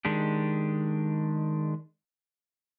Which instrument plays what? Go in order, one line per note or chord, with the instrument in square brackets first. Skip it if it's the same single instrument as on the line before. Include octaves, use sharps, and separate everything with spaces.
[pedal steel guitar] D#3 G#3 D4 G4